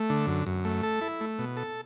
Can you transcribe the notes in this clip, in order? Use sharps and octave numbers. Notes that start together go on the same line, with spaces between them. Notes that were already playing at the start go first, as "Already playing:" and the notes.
Already playing: A3
D3
F#2
F#2
A3
A4
E4
A3
B2
A4